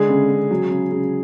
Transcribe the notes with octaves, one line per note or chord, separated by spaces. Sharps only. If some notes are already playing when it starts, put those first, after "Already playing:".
Already playing: D3 G#3 G#4
C#3
C#3
F#3
C#3
C#3